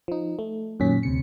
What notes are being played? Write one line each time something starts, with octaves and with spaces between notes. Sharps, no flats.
F3 D#4
A3
F#2 A#2 D#3 C#4 B6
D2 C3 C#7